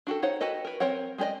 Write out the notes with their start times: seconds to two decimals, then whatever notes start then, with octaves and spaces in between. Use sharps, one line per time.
0.07 D4 F#4 G4 A4
0.22 D#4 C5 C#5 F#5
0.41 F#4 G4 A4 B4 D#5
0.65 A#4 B4
0.80 C4 A#4 C#5 F#5
1.18 G#3 G4 G#4 D5 D#5